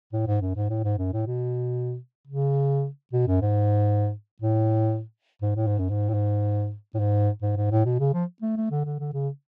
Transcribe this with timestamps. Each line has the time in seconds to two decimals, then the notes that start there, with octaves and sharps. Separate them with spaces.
0.12 A2
0.27 G#2
0.41 F#2
0.55 G#2
0.69 A2
0.84 G#2
0.98 F#2
1.13 A2
1.27 B2
2.27 C#3
3.13 B2
3.27 F#2
3.41 G#2
4.41 A2
5.42 G#2
5.56 A2
5.67 G#2
5.79 F#2
5.90 G#2
6.09 A2
6.14 G#2
6.94 A2
6.99 G#2
7.42 G#2
7.56 G#2
7.71 A2
7.85 B2
8.00 C#3
8.14 F3
8.42 A3
8.57 A3
8.71 D3
8.85 D3
8.99 D3
9.13 C#3